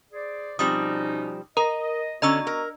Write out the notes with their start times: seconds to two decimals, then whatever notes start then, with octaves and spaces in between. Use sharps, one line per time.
0.12 G#4 C5 D5
0.59 B2 F3 G3 C4 C#4 D#4 D#6
1.57 A#4 D#5 A#5
2.22 D3 B3 C#4 F#4 D#5 A#5 E6
2.47 A#4